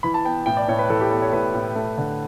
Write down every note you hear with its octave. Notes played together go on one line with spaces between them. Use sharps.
E3 B5
A5
B3 G5
A2 G5
D5
A2 C#5
B4
E3 A4
G4
B3 A4
C#5
A2 B4
A2
A3
D3